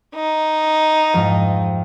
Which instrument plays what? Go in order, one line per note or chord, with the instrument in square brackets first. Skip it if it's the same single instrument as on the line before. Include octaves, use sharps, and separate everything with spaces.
[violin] D#4
[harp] F2 G#2 F3